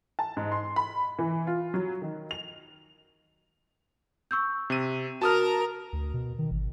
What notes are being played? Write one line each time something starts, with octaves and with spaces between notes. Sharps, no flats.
A5
G#2
C6
B5
E3
F4
F#3
D#3
F7
C#6 E6 G6
C3 D#7
F#4 A#4 A5 A#5 D#6 F6
D2
B2
D#3
G#1